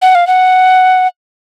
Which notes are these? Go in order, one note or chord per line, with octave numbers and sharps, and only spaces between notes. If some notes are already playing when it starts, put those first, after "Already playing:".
F#5
F5
F#5